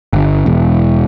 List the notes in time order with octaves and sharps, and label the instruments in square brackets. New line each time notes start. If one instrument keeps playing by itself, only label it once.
[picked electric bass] G1
E1